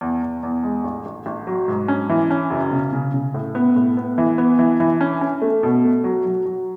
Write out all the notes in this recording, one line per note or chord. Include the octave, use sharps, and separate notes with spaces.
E2
E2
E2
G#3
A1
A1
A1
F#3
G#2
C#4
E3
C#4
F#1
C#3
C#3
C#3
A2
B3
A2
B3
E3
B3
E3
E3
C#4
C#4
A3
B2
A3
F#3
F#3
F#3